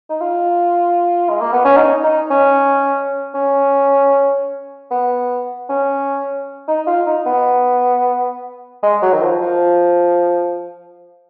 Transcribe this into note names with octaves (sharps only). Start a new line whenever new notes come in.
D#4
F4
G#3
A#3
B3
C#4
D#4
D#4
C#4
C#4
B3
C#4
D#4
F4
D#4
B3
G#3
F#3
D#3
F3
F3